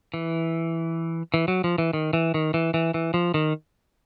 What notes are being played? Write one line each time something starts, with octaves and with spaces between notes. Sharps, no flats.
E3
E3
F#3
F3
E3
D#3
E3
D#3
E3
E3
E3
F3
D#3